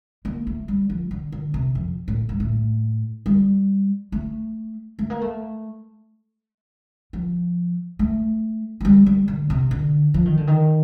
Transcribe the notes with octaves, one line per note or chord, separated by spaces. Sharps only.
A#3
A3
G3
F3
D3
D3
C3
F2
A2
G2
A2
G3
A3
A3
A#3
A3
F3
A3
F3
G3
G3
D3
C3
D3
F3
D#3
D3
D#3